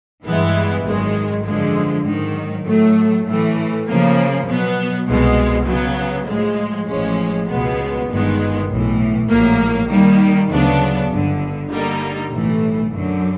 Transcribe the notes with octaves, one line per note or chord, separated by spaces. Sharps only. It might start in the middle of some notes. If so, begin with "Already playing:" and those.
G2 E3 G#3 B3 E4
G#1 F#2 D#3 G#3
F#2 D3 F3 G#3
G#2 D#3 F#3
A2 F#3 A3
A2 E3 A3
C#3 F3 A#3
B2 F#3 B3
C2 B2 G#3
C#3 F#3 B3
A2 F3 G#3
A1 A2 F3 G#3 C#4
C#2 B2 G#3 B3
G1 G2 D#3 G#3 B3
B1 A2 E3
A#1 A2 F#3 A#3
D#3 G3 A#3
D2 C#3 F#3 B3 D4
G1 G2 D3
D3 G3 A#3 D#4
B1 A2 E3 A3
F#2 D3 F#3